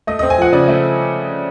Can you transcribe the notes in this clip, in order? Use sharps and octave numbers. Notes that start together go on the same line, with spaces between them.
A3 D#5
C4 D#5
G#5
F3 F#5
C#3 D5
A3